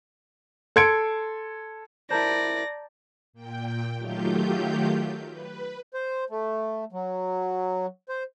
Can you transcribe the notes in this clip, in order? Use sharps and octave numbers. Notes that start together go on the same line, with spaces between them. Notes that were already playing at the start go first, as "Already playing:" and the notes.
A4 C6 G#6 C#7 D7
E4 A#4 C5 D5 A5 A#5 G6 A#6
A#2 G5
D#3 F#3 A3 F4 G4 G6
B4
C5
A3
F#3
C5